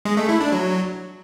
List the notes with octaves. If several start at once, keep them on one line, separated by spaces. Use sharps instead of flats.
G#3
A3
E4
D4
F#3